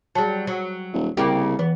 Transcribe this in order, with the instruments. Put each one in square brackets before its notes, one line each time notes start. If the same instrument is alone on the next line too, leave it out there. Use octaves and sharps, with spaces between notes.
[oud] F#3 G3 [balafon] G#4 A5
[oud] F#3
[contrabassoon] D#1
[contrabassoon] C2 [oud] C#3 A#3 G4
[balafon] E3 [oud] B3